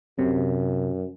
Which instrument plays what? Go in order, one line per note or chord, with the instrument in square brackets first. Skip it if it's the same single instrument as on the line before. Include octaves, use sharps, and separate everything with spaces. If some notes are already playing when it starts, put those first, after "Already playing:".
[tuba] F#2 [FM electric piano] C3